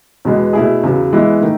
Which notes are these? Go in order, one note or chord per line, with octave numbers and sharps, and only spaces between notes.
E2 B2 G#3 B3
B2 A3 E4 G#4
E2 C#3 F#3
E3 G#3 B3 E4
D#3 A3